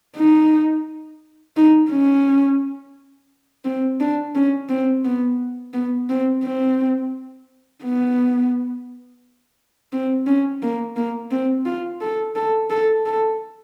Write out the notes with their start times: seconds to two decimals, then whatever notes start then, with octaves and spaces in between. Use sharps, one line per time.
0.16 D#4
1.57 D#4
1.91 C#4
3.65 C4
4.00 D4
4.35 C#4
4.69 C4
5.05 B3
5.74 B3
6.09 C4
6.43 C4
7.84 B3
9.93 C4
10.26 C#4
10.62 A#3
10.97 A#3
11.31 C4
11.66 F4
12.01 A4
12.36 A4
12.70 A4
13.06 A4